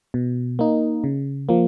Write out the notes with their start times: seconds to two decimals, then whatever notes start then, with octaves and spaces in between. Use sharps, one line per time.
0.14 B2
0.59 A#3 D#4
1.04 C#3
1.49 F3 A#3